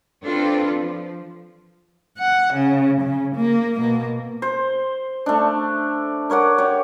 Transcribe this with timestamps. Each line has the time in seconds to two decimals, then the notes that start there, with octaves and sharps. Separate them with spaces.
0.24 C4 D4 F4 A4 B4
0.73 F3
2.18 F#5
2.54 C#3
3.01 C#3
3.36 A#3
3.78 B2 A#3
4.42 C5
5.26 A3 D4
6.30 A#4 C#5 F#5 D6
6.58 G4 C#5